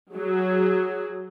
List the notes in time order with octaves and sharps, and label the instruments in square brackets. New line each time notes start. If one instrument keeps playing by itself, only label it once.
[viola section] F#3 G#4